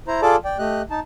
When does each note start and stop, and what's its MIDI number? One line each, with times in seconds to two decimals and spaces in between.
0.07 0.21 64
0.07 0.21 72
0.07 0.21 82
0.22 0.36 65
0.22 0.36 68
0.22 0.36 69
0.22 0.36 74
0.22 0.36 81
0.22 0.36 86
0.45 0.57 74
0.45 0.57 79
0.59 0.82 57
0.59 0.82 67
0.59 0.82 75
0.59 0.82 90
0.91 1.00 63
0.91 1.00 81